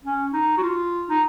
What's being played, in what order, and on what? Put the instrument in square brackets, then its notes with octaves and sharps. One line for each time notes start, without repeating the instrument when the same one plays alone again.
[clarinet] C#4
D#4
F#4
F4
D#4